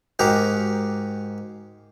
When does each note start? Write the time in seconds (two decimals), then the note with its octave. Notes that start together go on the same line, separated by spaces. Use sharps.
0.19 G#2 F#4 G4 A#4